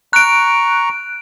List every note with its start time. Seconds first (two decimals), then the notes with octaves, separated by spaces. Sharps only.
0.13 A#5 C#6 F#6 D7